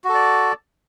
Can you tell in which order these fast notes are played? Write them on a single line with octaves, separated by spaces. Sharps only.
F#4 A4 D5